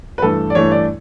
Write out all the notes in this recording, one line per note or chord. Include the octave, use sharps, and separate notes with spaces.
B4
G2 E3 A3 A4
D5
G2 E3 A3 C#5
D5